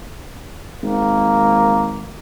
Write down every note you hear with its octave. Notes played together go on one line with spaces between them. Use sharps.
G#1 A#3